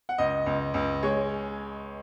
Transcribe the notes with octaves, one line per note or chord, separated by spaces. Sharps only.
F#5
C#2 D#5
C#2
C#2
G#3 C#5